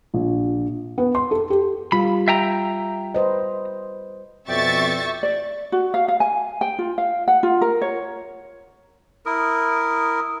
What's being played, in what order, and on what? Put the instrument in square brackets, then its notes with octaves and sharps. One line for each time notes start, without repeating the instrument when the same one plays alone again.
[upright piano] A#1
[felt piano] B3
C6
A4
G4
[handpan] G3 F4 [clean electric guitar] B5
[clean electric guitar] E5 G5 A#5
[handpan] B4 C5 D#5
[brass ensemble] F2 B2 [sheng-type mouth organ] D5 G5 [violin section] E5 C#6 A6
[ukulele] D5
F#4
F5
F5
G#5
G5
F4
F5
F#5
F4
A#4
C#5
[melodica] E4 A#4 [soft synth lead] D#6